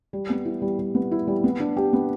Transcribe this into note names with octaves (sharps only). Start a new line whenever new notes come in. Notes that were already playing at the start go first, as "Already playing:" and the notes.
G3
B3
E4
G3
G3
B3
E4
G3
B3
D4
G4
B3